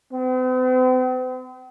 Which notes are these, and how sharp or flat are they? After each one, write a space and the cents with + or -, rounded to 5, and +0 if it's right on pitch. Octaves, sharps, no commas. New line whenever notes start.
C4 -45